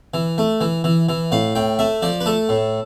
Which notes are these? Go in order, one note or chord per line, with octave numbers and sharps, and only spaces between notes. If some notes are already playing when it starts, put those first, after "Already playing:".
E3
A3
E3
E3
E3
A2 F5
A2 G5
A3 E5
F3 D5
B4
A3 A4
A2